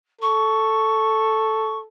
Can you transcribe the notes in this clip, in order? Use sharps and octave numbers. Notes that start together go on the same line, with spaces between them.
A4 C#6